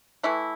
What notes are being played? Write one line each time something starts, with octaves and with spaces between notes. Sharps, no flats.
E3 A3 E4